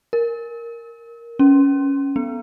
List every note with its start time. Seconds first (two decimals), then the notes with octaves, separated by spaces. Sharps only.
0.13 A#4
1.39 C#4
2.16 B3